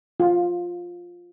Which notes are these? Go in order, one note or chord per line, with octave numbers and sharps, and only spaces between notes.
F4